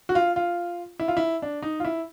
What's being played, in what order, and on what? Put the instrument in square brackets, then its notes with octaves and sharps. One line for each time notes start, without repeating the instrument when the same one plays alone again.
[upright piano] F#4
F4
F4
E4
F4
E4
D4
D#4
F4
E4